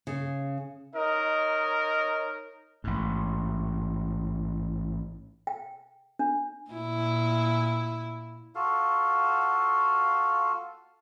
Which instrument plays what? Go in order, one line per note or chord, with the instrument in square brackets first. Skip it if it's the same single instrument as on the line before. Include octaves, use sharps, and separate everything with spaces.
[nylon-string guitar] C#3
[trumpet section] D#4 A#4 C#5 D#5
[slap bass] A1 G#2
[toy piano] G5
D4
[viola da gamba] A#2 E4
[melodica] F4 F#4 A4 F5